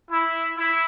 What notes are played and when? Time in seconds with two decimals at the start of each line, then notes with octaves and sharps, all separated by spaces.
0.10 E4
0.57 E4